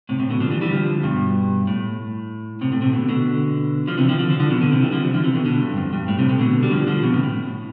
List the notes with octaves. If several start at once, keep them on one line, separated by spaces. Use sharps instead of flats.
A2 C3
A2 C3
B2 D3
D3 F3
E3 G3
E3 G3
D3 F3
G2 B2
A2
A2 C3
A2 C3
A2 C3
B2 D3
B2 D3
D3 F3
C3 E3
D3 F3
D3 F3
D3 F3
D3 F3
B2 D3
B2 D3
C3 E3
E3 G3
D3 F3
C3 E3
D3 F3
C3 E3
B2 D3
B2 D3
G2
F2
G2
A2
A2 C3
A2 C3
B2 D3
G3
D3 F3
D3 F3
G2 B2
A2 C3
A2